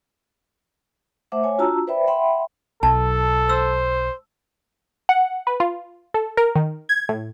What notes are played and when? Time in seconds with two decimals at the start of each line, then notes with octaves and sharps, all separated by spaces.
1.32 A3 C5 E5 F#5 D6
1.43 C#5 G#5
1.58 D4 F4 F#4 A5 A#5 E6
1.87 B4 C5 D5 E5 G5 B5
2.07 E5 F#5 G5 B5 C6
2.83 B1 A4 A5
3.49 C5 E6
5.09 F#5
5.47 B4
5.60 F4
6.14 A4
6.37 A#4
6.56 D#3
6.89 G#6
7.09 A2